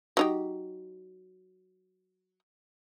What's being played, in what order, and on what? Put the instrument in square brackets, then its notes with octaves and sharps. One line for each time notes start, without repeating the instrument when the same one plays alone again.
[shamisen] F#3 D#4 G4